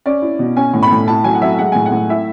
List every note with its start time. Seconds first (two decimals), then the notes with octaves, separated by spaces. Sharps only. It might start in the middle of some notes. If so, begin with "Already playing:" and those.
0.06 C#4 D5
0.22 E4
0.39 B2
0.56 C#4 G#5
0.74 A2
0.83 B5
0.91 A2
1.08 E4 A5
1.24 F#3 G#5
1.35 F#5
1.41 F#3 E5
1.59 G#3 F#5
1.72 A2 G#5
1.86 F#5
1.92 A2
2.09 E4 E5